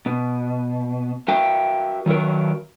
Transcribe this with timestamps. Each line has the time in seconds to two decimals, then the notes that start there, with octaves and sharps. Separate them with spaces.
0.06 B2
1.28 F#4 A#4 E5 G5
2.06 D#3 F#3 F#4 A#4